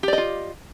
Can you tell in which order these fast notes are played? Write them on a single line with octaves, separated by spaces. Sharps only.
G4 D5 D#5 F4